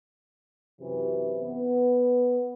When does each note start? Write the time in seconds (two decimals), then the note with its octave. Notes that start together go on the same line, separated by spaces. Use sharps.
0.81 F#2 C3 E3
1.39 B3